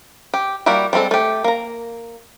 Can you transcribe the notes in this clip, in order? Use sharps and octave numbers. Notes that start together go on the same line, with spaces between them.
G4
G3 A#3 E4 F#4 G4
G3 G#3 C4 A4
A3 G4
A#3 A#5